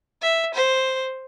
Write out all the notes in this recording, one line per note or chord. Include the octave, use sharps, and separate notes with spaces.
E5
C5